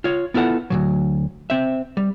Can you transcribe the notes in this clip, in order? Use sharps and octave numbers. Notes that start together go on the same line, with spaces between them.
F4 C#5
B3 E4 F4 A4 F#5
D2 B2 F#3
C4 E5
G3